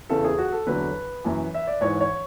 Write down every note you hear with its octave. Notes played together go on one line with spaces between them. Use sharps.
E2 C#3 E3 A4
G#4
F#4
A4
E2 D3 F#3 B4
F#2 E3
E5
D5
G#2 E3 C#5
C#5